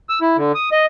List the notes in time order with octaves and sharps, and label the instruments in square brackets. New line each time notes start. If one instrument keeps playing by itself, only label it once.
[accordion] E6
E4
D3
D#6
D#5